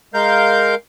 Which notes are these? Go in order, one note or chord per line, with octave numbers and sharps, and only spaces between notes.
G#3 A#4 F5 G6